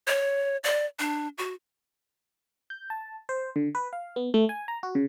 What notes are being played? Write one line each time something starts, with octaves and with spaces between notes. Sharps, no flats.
C#5
D5
D4
F#4
G6
A5
C5
D3
B4
F5
B3
A3
G#5
A#5
F#4
C#3